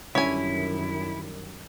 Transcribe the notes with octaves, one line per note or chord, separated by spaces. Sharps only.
F#2 D3 D#3 G3 C#4 E4 C#5 G#5